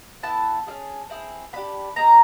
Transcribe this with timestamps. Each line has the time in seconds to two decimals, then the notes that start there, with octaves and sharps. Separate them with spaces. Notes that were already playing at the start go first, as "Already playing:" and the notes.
0.23 B3 E4 A4 A5
0.67 C#4 E4 G#4
1.10 C4 E4 G#4
1.53 B3 D4 G4 B5
1.96 C4 D#4 G#4 A#5